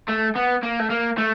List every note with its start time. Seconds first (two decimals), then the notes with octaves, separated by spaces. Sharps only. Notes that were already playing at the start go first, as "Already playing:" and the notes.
0.09 A3
0.36 B3
0.63 A#3
0.80 A3
0.90 A#3
1.18 A3